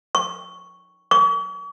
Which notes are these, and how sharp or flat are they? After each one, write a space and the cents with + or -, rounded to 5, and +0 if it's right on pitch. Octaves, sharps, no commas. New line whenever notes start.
C#6 +0
C#6 +45